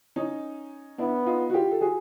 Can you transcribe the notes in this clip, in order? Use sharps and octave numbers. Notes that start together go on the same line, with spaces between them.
C#4 D#4
B3 D4 E4
D#4 F4
F#4
F4 G4
A4
F#4 G#4